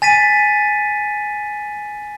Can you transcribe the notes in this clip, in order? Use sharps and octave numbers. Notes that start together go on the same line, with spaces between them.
G#5 A6 B6 D#7